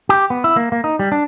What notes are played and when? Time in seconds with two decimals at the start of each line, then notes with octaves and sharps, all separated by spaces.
0.09 G4
0.30 B3
0.44 E4
0.57 A#3
0.72 A#3
0.84 D#4
0.99 G3
1.12 D4